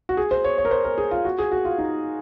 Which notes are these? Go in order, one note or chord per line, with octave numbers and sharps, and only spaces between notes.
F#4
G#4
C5
C#5
C#5
A#4
C5
A#4
G#4
F4
F#4
G#4
F#4
F4
D#4